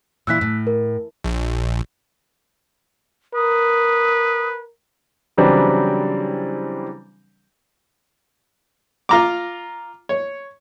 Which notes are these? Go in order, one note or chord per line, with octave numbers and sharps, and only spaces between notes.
A#2 E3 E4 E6 F#6 B6
A2
A#4
A#1
A#4 B4 D#6
C#3 E3 F#3 G3 C4 D4
F4 A#5 D6
C#5